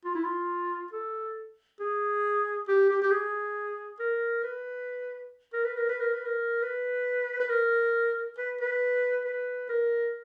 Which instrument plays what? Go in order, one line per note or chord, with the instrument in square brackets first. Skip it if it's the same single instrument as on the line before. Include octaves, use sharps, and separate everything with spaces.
[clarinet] F4
E4
F4
A4
G#4
G4
G4
G4
G#4
A#4
B4
A#4
B4
A#4
B4
A#4
B4
A#4
B4
B4
A#4
B4
B4
B4
A#4